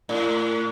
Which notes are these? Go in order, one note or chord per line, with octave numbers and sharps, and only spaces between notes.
A2